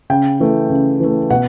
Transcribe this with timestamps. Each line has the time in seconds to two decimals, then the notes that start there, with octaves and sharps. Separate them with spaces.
0.10 C#3 G5
0.40 E3 A3
0.70 C#3
1.00 E3 A3
1.30 B2 F#5